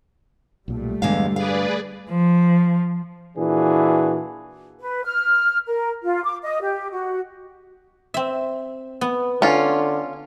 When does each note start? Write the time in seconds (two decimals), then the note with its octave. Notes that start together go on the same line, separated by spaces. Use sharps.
0.68 B1 A#2 G3 A3
1.02 E2 G2 D3 G#3 F5
1.36 G#4 B4 D5 F5
2.10 F3
3.37 A#2 E3 D4 E4 F#4 G#4
4.80 B4
5.05 F6
5.66 A#4
6.04 F4
6.24 D6
6.44 D#5
6.62 G4
6.92 F#4
8.14 C4 E5
9.01 B3
9.42 D3 C#4 F4